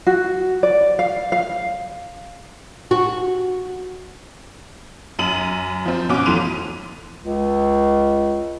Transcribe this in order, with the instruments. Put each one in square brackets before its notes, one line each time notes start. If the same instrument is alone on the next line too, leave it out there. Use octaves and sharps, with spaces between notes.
[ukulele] F#4
D5
F5
F5
[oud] F#4
[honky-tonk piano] F#2 D#7 F#7
F3 C4
B2 C#4 F#4 D6 F#6
F2 E3 A3 C6 D#7 F7
[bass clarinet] C#2